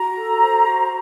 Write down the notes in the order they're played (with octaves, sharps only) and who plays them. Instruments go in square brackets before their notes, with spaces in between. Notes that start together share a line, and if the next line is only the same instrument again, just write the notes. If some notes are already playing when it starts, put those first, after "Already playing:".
Already playing: [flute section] F#4 A#5
A4
C5
F#4